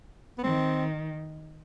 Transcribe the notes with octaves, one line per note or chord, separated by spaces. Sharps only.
B3
D#3 C4